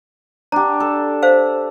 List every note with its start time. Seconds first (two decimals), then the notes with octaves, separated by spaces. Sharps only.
0.52 D4 G4 A#5
0.80 A4
1.23 C5 F5